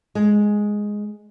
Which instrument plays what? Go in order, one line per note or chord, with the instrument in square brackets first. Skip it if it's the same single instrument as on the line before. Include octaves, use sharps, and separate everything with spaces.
[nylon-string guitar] G#3